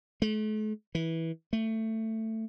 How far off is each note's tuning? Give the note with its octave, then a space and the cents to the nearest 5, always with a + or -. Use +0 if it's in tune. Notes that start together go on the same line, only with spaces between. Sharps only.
A3 -40
E3 -15
A3 +15